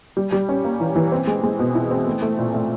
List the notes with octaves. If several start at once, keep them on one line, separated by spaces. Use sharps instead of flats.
G3
G3
C#4
A#3
E3
E3
C4
G#3
G#3
B2
E4
C4
A3
A3
A#2
A3